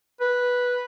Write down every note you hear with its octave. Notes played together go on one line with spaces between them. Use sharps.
B4